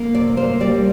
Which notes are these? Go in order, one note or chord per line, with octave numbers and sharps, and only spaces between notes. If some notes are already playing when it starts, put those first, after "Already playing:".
Already playing: A#3
C3 D5
A#3 C5
G3 D5